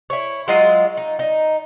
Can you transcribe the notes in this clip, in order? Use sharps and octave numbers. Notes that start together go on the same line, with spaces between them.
E4 C#5
F#3 G#3 F4 D#5
D#4
D#4